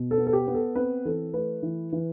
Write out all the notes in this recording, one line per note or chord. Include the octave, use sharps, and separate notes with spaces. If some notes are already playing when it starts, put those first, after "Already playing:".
Already playing: B2
A4
B3
A4
G4
B3
A4
C4 B4
E3 A4
A3 B4
E3
E3